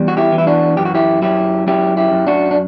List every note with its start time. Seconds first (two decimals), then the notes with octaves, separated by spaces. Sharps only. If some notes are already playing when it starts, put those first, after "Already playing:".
Already playing: E2 G3
0.08 F#4
0.17 E4 G4
0.32 E3
0.38 E4
0.47 D4 F#4
0.77 F#2 G4
0.85 F#4
0.95 E4 G4
1.22 F#3 E4 G4
1.67 F#2 E4 G4
1.97 E4 G4
2.12 F#2
2.27 D4 F#4
2.51 D4